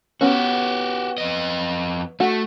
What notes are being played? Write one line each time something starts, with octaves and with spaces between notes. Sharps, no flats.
B3 C#4 F#4 G4
F2 D#5
A3 F#4